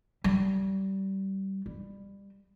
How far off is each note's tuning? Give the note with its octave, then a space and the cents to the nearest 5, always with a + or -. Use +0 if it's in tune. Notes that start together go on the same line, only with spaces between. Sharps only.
G3 -25
G3 +20